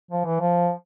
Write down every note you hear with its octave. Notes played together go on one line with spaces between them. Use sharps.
F3
E3
F3